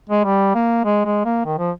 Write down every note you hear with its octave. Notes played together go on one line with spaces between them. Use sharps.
G#3
G3
A#3
G#3
G#3
A#3
D#3
F3